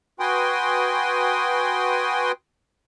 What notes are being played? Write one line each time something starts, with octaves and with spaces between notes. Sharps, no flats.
F#4 B4 G5 G#5 C6 D#6